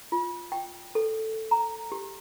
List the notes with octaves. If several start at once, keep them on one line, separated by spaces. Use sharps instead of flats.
F4
G5
A4
A#5
G4